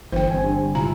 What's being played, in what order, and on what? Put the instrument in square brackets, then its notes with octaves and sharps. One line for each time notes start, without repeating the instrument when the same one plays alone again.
[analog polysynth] G1 [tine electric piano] E3 [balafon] C5 G5
[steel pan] C4 G#5
[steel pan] G3 [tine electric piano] D4
[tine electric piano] G#2 C3 [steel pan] G3 E4 F4 [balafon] A#5